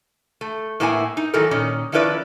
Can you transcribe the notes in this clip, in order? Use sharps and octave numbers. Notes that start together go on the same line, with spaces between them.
A3
A2 A#3 B3 E4 A4 G#5
D#4
D#3 E3 F#3 A3 A4 A#4
A#2 D#3 C#4
D#3 F3 C#4 E4 B4 D5